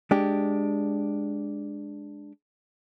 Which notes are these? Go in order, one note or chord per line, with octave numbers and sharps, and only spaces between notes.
G#3 D4 G4